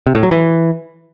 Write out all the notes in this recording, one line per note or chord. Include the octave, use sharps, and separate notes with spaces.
C3
A2
F#3
E3